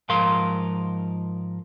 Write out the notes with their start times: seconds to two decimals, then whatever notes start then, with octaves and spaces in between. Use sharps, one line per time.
0.09 G#2 F3 A#4 F5 C6